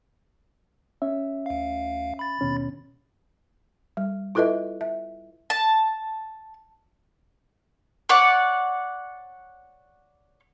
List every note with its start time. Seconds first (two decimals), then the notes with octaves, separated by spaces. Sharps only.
1.02 C#4 E5
1.46 D2 F5
2.19 B5 A6
2.41 D#2 B2 C#4
3.97 G3
4.35 E4 F4 A4 B4 D#5 E5
4.81 E5
5.50 A5
8.09 C#5 D5 F#5 D6